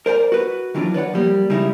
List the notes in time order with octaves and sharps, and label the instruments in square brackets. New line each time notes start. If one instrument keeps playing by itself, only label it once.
[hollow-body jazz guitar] A#4 C5 D5 G5 A#5
F#4 B4
D#3 E3 F#3 D4 F4
B4 C#5 D5 F#5
F3 G3 A#3
C#3 G3 G#3 D#4 E4